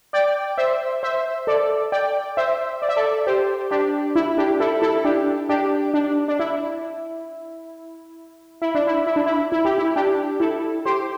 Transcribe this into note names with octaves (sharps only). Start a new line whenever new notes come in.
D5 G5
C5 E5
C5 E5
A4 D5
D5 G5
C5 E5
D5
E5
A4 D5
G4 C5
D4 G4
E4
D4 G4
E4 A4
E4 A4
D4 G4
D4 G4
D4
D4
E4
E4
D4
E4
E4
D4
E4
E4
G4
E4
D4 G4
E4 A4
G4 C5